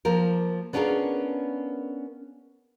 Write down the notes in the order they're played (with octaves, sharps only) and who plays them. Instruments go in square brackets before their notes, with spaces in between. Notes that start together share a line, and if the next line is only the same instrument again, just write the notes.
[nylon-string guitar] F3 A#3 A#4
B3 C#4 D4 F4 G#4 A#4